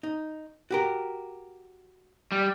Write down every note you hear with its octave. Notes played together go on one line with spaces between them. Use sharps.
D#4
F#4 G4 A#4
G3